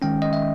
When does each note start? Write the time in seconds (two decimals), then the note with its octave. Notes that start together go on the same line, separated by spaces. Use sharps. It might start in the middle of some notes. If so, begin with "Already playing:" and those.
0.02 D#3 G#3 C#4 G5
0.22 D#5
0.33 E5